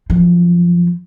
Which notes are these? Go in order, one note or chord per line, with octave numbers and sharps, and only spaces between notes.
F#2 F3